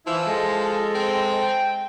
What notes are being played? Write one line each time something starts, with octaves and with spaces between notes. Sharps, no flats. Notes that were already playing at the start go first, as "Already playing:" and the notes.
E3 F3 E4 E6
G#3 A4
C4
G5